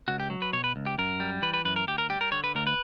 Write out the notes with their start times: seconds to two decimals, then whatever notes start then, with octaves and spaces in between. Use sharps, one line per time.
0.08 C#2 F#4
0.20 G4
0.30 F#3
0.42 B4
0.53 B2 C#5
0.64 B4
0.76 C#2
0.86 G4
0.98 F#2 A#4
1.20 G3
1.42 E3 B4
1.54 B4
1.65 F#2 B4
1.76 A#4
1.87 D2 G4
1.98 A#4
2.10 G3 G4
2.21 A#4
2.32 D3 C#5
2.44 B4
2.55 D2 A#4
2.67 B4